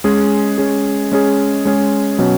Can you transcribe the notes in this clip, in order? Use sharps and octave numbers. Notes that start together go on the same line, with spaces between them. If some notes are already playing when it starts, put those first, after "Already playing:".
G#3 C#4 G#4
G#3 C#4 G#4
G#3 C#4 G#4
G#3 C#4 G#4
B2 F#3 C#4